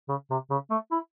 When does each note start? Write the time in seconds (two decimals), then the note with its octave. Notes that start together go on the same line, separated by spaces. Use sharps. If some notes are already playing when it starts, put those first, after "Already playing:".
0.09 C#3
0.30 C3
0.51 C#3
0.70 A3
0.92 E4